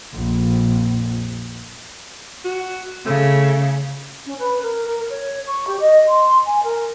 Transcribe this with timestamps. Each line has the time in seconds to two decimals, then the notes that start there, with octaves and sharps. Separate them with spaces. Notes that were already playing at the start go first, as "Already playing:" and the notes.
0.14 A#1 F2
2.45 F#4
3.06 C#3 A3
4.26 C#4
4.39 B4
4.61 A#4
4.85 A#4
5.09 C#5
5.46 C#6
5.67 G4
5.80 D#5
6.08 C6
6.45 G#5
6.63 A#4